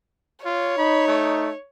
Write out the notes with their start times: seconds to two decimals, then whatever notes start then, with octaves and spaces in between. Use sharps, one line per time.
0.45 F4 C#5
0.78 D#4 B5
1.07 A3